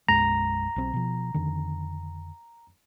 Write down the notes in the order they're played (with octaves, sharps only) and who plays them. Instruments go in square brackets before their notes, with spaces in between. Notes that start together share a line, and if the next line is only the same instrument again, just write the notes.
[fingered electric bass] B1 F#2 G#3 [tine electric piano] A#5
[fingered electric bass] B1 B2 C4
B2 F3
F2 D3 D#3